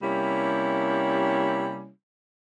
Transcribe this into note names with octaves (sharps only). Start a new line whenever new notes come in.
C3 G3 A#3 C#4 E4 G4